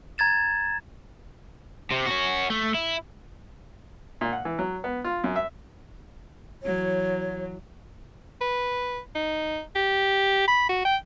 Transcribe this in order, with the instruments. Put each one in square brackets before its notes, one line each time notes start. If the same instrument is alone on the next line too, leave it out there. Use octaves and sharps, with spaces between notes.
[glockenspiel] A#5 G#6 A6 E7
[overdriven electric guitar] C3
C#4 F#4
A3
E4
[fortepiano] A#2
F#5
E3
F#3
B3
F4
F#2
E5
[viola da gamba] E3 F#3 [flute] C#5
[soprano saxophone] B4
D#4
G4
B5
F#4
G5